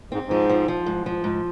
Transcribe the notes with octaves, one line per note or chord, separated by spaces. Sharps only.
G#2 C4
G#2 F3
F3
F3
G#2
F3
G#2